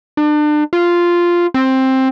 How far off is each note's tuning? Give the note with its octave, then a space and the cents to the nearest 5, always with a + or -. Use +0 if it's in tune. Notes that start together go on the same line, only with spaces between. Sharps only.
D4 +35
F4 -5
C4 +10